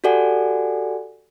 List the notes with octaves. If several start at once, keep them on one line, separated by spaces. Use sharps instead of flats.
F#4 G4 A4 D5 F#5 G#5